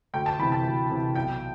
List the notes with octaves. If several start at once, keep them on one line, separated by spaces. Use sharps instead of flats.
D2 G5
A5
C3 E3 B5
A5
D2
C3 E3
B1 G5